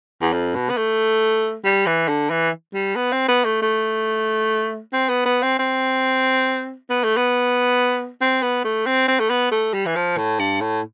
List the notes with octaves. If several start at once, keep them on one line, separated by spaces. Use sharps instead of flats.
E2
F2
B2
B3
A3
G3
E3
D3
E3
G3
B3
C4
B3
A3
A3
C4
B3
B3
C4
C4
B3
A3
B3
C4
B3
A3
C4
C4
A3
B3
A3
G3
E3
F3
A2
G2
A2